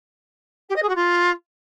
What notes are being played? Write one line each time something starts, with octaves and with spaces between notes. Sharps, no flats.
G4
D#5
G#4
F#4
F4